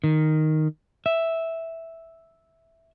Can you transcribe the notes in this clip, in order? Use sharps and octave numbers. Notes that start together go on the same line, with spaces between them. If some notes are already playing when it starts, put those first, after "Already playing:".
D#3
E5